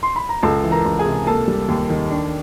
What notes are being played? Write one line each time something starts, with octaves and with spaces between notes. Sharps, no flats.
C6
B5
A#5
C#2 A4 A5
E3
A#4 A#5
C#2
G#4 G#5
C3
A#3 A4 A5
G3
D#2
D#3
D4